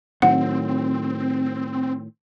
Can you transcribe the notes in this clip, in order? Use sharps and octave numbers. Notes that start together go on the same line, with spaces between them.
A2 D#3 F#3 C4 F#5